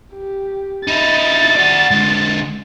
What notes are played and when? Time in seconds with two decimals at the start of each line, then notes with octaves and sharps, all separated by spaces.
0.14 G4
0.87 D#4 E4 A6
1.56 F#4 D5
1.91 D3 G#3